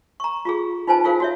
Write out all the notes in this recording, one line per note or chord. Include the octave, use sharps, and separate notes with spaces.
A#5 C#6
F4 G4 G#4
D#4 F4 B4 C5 G#5 A5
E4 F4 G#4 A#4 C5 F5
F#4 C#5 E5